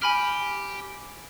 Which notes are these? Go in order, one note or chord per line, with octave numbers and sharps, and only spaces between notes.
G4 G#5 B5 F6